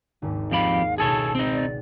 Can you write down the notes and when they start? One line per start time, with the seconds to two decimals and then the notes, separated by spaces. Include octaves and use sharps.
0.22 G#1 D#2 G#2
0.51 F2 G4 F5 B5
0.98 C#2 B2 G#4 A4 C#5 A5
1.35 C4 D#4
1.53 D5